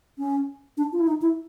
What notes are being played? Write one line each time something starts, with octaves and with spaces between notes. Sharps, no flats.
C#4
D4
F4
E4
D#4
E4